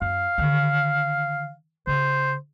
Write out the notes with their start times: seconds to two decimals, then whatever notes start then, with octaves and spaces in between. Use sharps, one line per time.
0.02 F#2 F5
0.38 D3 D#3
1.87 C#3 C5